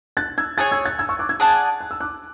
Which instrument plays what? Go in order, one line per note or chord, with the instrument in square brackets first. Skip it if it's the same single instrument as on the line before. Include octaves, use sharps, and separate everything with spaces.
[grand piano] F#6 A6
E6 G#6
[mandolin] G#4 C#5 G#5 [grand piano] F#6 A6
[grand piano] E6 G#6
F#6 A6
E6 G#6
C#6 E6
D6 F#6
E6 G#6
[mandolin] G#4 D5 F#5 A5
[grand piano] F#6
E6
D6 F#6